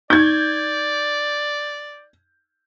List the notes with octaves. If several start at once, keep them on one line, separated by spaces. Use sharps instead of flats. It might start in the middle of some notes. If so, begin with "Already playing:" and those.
D#4 D5 G6 G#6